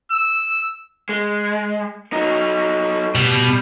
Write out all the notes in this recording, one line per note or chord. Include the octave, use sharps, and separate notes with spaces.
E6
G#3
F#3 D#4
B2 G3